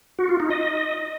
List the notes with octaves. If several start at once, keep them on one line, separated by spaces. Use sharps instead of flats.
F#4
F4
D#4
D#5